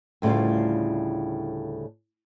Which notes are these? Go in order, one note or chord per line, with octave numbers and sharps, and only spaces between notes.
D2 A2 C#3 G3 F4